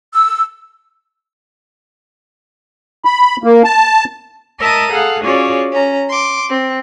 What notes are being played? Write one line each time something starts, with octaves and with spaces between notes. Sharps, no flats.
E6
B5
A#3
A5
A#4 D#5 E5 A5 A#5 D#6
G#4 A4 F5 F#5
C#4 F4 F#4 G#4 C#5 D5
C#4 A#5
C6 D6
C4